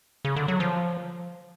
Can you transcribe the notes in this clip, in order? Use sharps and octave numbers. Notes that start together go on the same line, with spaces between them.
C#3
D3
F#3
F3